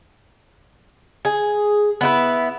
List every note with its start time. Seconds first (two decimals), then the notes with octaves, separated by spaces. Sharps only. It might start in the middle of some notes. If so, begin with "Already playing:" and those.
1.25 G#4
2.01 B3 E4 B4